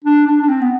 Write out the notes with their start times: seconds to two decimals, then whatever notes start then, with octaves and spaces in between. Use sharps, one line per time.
0.04 D4
0.27 D4
0.41 D4
0.48 C4
0.61 B3